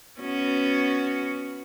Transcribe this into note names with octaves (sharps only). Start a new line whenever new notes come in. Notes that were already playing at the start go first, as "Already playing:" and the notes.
B3 C#4 F#4